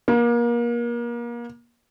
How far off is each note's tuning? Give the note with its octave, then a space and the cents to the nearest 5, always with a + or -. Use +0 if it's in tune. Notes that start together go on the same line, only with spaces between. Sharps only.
A#3 +30